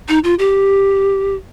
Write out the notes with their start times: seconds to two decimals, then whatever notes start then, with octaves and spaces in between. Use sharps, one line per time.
0.09 D#4
0.24 F4
0.39 G4